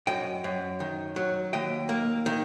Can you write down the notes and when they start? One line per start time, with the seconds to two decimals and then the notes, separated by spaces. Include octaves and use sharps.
0.07 F#2 D#5 G5
0.44 F#2
0.80 D#3
1.16 F#3
1.53 D#2 D#5 G5
1.89 A#3
2.26 D#3